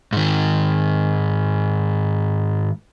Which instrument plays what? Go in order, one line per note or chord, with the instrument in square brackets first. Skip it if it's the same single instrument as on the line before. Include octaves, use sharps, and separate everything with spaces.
[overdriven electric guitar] G#2 D#3